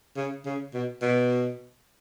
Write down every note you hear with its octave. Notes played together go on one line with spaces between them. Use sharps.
C#3
C#3
B2
B2